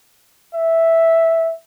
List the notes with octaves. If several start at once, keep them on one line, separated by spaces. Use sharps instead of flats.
E5